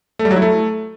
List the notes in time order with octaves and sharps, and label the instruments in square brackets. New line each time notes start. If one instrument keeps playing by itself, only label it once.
[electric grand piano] A3
G3
F#3
E4
A3